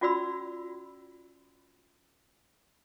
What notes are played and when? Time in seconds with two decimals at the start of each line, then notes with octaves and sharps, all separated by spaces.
0.01 C#4 F4 F#4 D5 B5 E6